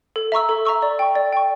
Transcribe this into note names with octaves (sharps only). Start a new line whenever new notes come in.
A4
E5 A#5 C#6 E6
A4
E5 A#5 C#6 E6
D5
G5 C#6
D5
G5 C#6